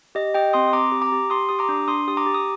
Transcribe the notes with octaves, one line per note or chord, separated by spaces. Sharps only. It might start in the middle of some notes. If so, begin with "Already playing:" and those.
G4 D#5
G4 D#5 G5
C4 C6 D#6
D#6
C4 A#5 D6
G4
A#5 D6
G4
G4 C6 D#6
G4 D#6
A#5 D6
D4
D4 C6 D#6
G4 D#6
A#5 D6
G4
D#6